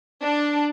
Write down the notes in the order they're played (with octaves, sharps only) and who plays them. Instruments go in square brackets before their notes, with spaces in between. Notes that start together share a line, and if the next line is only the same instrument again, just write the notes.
[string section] D4